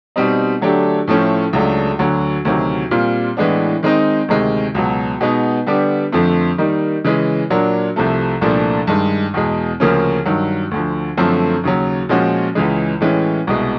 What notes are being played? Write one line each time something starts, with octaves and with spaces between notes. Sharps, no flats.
B2 G3 C4 D#4
D3 F#3 A3 D4 G4
A2 F3 A3 C#4
C#2 C#3 F#3 A3 D4
D2 D3 F#3
D2 C3 D#3 F#3
A#2 G3 C4 F4
A2 E3 G#3 B3 D4
D#3 G#3 C4 D#4
D2 C3 D#3 G#3
C#2 B2 F#3
B2 G#3 B3 D#4
D3 G3 B3 D4 G4
F2 D3 F3 A3 C4
D#3 G3 A#3 D#4
C#3 E3 G#3
A#2 F#3 A#3 D4
C2 C3 F3 A3
C2 A#2 F3 A3 D4
G2 D#3 G#3
E2 B2 G#3
D2 C#3 F3 A#3 C#4
G2 D#3 F#3
D2 D3 F3
F#2 D3 F3 A3 C4
D#2 C#3 F#3
A#2 F3 G#3 C#4 F#4
C#2 C#3 E3 G#3
A2 E3 G#3 C#4
C2 B2 G#3